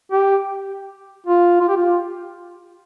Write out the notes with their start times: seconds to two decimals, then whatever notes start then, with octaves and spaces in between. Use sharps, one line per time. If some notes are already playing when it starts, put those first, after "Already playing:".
0.12 G4
1.27 F4
1.61 F4
1.69 G4
1.77 F4